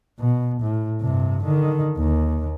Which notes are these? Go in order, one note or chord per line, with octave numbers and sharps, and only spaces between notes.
B2
A2
G2 C3
D3 D#3
D#2